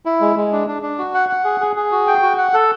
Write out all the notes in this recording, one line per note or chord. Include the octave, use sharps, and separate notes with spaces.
E4
G#3
G#3
D4
D4
D4
F#4
F#5
F#5
G#4
G#4
G#4
F#4
G5
F#4
F#5
A4